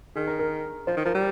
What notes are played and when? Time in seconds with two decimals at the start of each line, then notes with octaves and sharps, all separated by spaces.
0.16 D#3 G#4
0.27 A#4
0.39 A#4
0.87 F3 C5
0.97 D#3
1.05 F3 A#4
1.15 G3